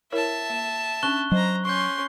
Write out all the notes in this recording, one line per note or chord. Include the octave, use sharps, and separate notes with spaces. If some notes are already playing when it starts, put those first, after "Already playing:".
E4 A#4 C#5 E5 A5
A#3
C#4 D4 C#6 F#6 G7
F#3 C5 D#5 A#5
C#4 C6 C#6 G6